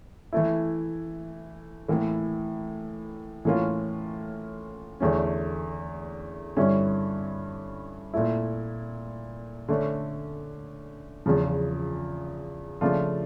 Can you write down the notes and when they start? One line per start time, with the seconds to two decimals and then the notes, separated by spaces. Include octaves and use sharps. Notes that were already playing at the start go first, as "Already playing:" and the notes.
0.33 E3 A3 E4
1.88 A2 E3 A#3
3.45 A2 E3 A#3 C#4 F4
5.00 E2 D3 A3 C#4
6.57 G2 D3 G3 C#4 E4
8.14 A#2 A3 E4
9.68 D3 A3 C#4
11.26 E2 C#3 F3
12.81 C#3 F3 A3 D4 F4